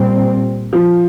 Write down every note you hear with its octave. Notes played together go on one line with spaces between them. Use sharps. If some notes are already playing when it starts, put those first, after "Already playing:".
Already playing: A#2 G3 C4
F3